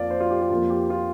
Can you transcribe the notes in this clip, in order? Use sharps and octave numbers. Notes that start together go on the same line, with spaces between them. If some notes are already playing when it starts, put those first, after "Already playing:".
Already playing: F2 F3 A#3 D5 F5
C5
F4
G4
G4
F2 F3 A#3 F4
G4
F4